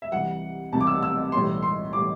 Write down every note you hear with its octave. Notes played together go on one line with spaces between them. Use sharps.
E5
C2 C3 E3 G3 F#5
C2 C3 E3 G3 A5
D6
E6
E6
B1 A2 E3 G3 C6
C6
A2 E3 G3 D6